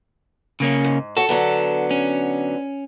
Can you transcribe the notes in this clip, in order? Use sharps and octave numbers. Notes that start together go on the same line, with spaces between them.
C#3 A#3 C#4
G#2
F#4 A4 C#5
D3 F#3 B3
C#4